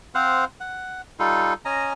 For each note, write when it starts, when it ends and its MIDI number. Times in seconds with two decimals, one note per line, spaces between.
0.15 0.45 60
0.15 0.45 72
0.15 0.45 77
0.15 0.45 78
0.60 1.01 78
1.19 1.54 55
1.19 1.54 63
1.19 1.54 65
1.19 1.54 69
1.65 1.93 61
1.65 1.93 75
1.65 1.93 80
1.65 1.93 82